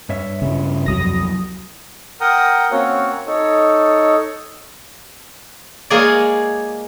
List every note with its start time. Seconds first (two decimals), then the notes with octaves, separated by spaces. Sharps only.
0.09 G2 C#5 E5
0.42 C#3 G3
0.86 C2 F2 F#3 D#6 A#6
2.21 A#4 F#5 G5 A#5 D#6
2.71 A#3 C4 C#4 F#4 C#5
3.27 D#4 A4 C#5
5.90 G#3 A#3 F4 G#4 C#5 D5